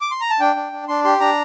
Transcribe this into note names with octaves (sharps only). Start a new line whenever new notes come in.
D6
C6
A#5
A5
D4 G5
D4
D4
D4 C6
G4 C6
D4 A#5